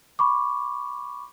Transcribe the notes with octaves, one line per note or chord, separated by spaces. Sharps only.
B5 C#6 D6